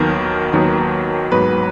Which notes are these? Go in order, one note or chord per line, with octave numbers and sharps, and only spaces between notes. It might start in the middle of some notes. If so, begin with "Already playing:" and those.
Already playing: D#2 D#3 F#3 B3 A#4
D#2 D#3 F#3 B3
G#2 F#3 B3 B4